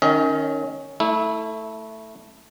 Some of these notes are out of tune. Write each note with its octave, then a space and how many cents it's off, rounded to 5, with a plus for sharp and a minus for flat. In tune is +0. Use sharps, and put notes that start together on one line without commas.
D#3 -10 C#4 +0 D#5 +40
A3 +5 E4 -20